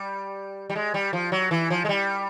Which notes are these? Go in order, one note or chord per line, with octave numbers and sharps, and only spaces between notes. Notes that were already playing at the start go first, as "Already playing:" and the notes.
Already playing: G3
G3
G#3
G3
F3
F#3
E3
F3
G#3
G3